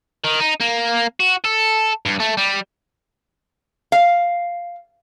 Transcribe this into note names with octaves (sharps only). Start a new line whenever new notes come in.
D#3
D#4
A#3
F#4
A4
G2
A3
G3
F5